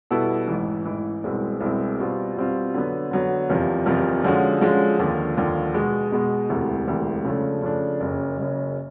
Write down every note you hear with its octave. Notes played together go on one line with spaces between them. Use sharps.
B2 G3 B3 E4 A4
A1 G#2 E3
A1 G#2 E3
C2 B2 G#3 C4 E4
C2 B2 G#3 C4 E4
B2 G3 C4 F4
B2 G3 C4 F4
D3 F#3 B3
D3 F#3 B3
F#1 E2 C3 F3
F#1 E2 C3 F3
D3 F3 G#3 C#4 F#4
D3 F3 G#3 C#4 F#4
D#2 D3 F3
D#2 D3 F3
B2 G#3 B3
B2 G#3 B3
E1 D2 C3 E3
E1 D2 C3 E3
C#3 F3 A3 D4
C#3 F3 A3 D4
F#1 F#2 C#3
F#1 F#2 C#3